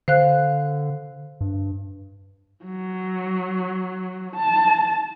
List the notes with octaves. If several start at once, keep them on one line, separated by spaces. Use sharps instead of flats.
D3 C5 F5 F#6
G2
F#3
A5